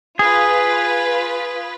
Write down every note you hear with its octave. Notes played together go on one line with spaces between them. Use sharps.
F4 G#4 B4